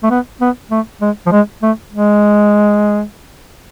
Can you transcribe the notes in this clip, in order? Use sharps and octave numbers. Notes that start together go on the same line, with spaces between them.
A3
B3
B3
A3
G#3
F3
G#3
A3
G#3